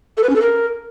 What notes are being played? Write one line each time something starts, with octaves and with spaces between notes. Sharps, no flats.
A4
B4
C#4
A4
A#4